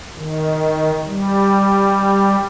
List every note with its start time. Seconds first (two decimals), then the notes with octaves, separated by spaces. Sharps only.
0.17 D#3
1.06 G3